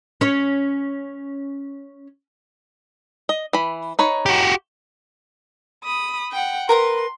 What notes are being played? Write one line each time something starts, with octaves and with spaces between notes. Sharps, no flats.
C#4 C#5
D#5
E3 B5
D#4 B4 C#5
F#4 G4
B5 D#6
F#5 G5
A#4 B4 A#5 C6